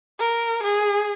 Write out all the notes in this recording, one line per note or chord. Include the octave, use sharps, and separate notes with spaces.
A#4
G#4